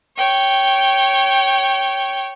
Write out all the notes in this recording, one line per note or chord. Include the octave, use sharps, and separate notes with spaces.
C#5 G5